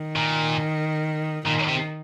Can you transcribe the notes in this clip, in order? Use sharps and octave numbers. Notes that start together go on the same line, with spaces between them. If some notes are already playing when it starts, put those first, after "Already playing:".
Already playing: D#3
A#2
A#2 D#3
C3